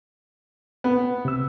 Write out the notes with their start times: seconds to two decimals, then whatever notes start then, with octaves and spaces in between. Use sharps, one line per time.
0.84 B3
1.25 C3 E6